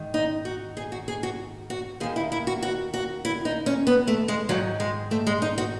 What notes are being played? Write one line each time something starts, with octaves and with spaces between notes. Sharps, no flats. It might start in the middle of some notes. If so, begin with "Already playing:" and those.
Already playing: G#2 D#3
D#4
F#4
G#4
F#4
G#4
F#4
F#4
D#2 D#3 G#4
E4
E4
F#4
F#4
F#4
E4
D#4
C#4
B3
A3
G#3
G#2 D#3 F#3
G#3
A3
G#3
D#4
F#4